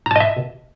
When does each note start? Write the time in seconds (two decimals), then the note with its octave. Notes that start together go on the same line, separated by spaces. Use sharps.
0.06 A#5
0.11 A5
0.16 D#5
0.20 E5